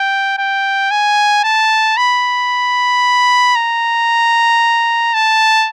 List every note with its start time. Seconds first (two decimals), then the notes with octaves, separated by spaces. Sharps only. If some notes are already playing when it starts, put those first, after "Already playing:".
Already playing: G5
0.38 G5
0.91 G#5
1.44 A5
1.97 B5
3.55 A#5
5.14 A5